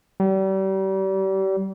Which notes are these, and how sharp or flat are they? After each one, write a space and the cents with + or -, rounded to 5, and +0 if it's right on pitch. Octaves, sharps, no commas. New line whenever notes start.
G3 -35